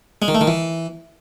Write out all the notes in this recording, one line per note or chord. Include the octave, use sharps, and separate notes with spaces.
G#3
D#3
A3
D#3
E3